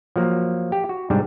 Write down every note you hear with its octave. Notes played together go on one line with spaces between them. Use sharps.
F3 F#3 A#3
G4
F#4
G#2 C3 G3 D4